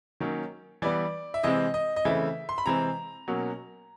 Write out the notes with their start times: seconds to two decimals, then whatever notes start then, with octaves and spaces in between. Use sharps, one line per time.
0.20 D#3 F#3 A#3 C#4
0.82 E3 G3 B3 D5
1.34 E5
1.43 C3 E3 G#3 C4 D#5
1.74 D#5
1.96 D#5
2.05 C#3 E3 A3 C4 E5
2.49 C6
2.58 B5
2.66 C3 E3 G#3 C4 A#5
3.28 B2 F#3 A#3 C#4